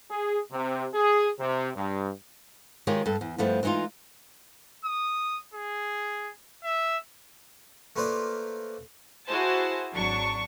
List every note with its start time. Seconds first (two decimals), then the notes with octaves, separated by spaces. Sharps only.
0.10 G#4
0.51 C3
0.94 G#4
1.39 C3
1.75 G2
2.87 D#3 G#3 F4 G4 G#4 C#5
3.06 G2 A4
3.21 E2
3.38 G2 F3 A3 B3
3.63 E3 G#3 C4 D#4 F4
4.85 D#6
5.54 G#4
6.64 E5
7.96 A3 A#3 F4 B4 C5 D5
9.26 E4 F#4 G#4 C5 G#5 A5
9.94 G#1 F#3 D4 C#6